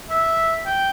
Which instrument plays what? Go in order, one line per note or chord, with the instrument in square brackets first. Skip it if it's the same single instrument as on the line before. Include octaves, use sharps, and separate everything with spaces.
[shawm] E5
G5